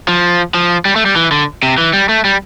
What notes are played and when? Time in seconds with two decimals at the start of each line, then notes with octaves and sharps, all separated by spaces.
0.08 F3
0.54 F3
0.85 G3
0.96 A3
1.06 G3
1.16 E3
1.31 D3
1.63 C3
1.78 E3
1.93 G3
2.09 A3
2.25 G3